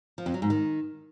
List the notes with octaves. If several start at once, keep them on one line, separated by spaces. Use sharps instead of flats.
F3
F2
F#3
G#2
D#3